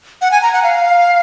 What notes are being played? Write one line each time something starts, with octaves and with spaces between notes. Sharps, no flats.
F#5
G#5
A#5
F#5
F5